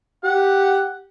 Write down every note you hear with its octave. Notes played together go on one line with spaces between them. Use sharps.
G4 F#5